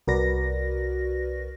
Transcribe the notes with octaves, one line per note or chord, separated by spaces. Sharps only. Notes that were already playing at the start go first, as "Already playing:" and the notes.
C2 F#4 A#4 B4 D5 A#6